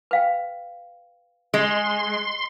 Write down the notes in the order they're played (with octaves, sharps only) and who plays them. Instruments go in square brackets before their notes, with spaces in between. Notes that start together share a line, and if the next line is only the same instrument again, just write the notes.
[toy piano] B4 F5 G5
[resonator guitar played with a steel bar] G#3 [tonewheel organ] C6